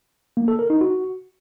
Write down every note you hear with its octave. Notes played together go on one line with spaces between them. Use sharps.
A#3
A4
A#4
D#4
F#4